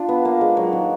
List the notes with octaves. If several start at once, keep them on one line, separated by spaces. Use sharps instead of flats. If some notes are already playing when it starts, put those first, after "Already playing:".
Already playing: D4 F4
B3
A#3
G#3
F#3
D#3